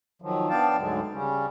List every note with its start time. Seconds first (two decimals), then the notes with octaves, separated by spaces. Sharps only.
0.22 D#3 F3 F#3
0.50 B3 D4 D5 F5 G5 A5
0.77 D2 G#2 D3 F#3 G#3
1.13 C#3 G3 C#4